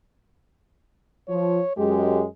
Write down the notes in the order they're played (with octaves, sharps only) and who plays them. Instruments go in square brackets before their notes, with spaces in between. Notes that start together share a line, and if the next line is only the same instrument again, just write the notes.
[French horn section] F3 [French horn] C#5
[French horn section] F#2 G#3 [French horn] G4